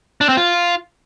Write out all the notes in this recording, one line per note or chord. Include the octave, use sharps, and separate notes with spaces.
D4
C4
F4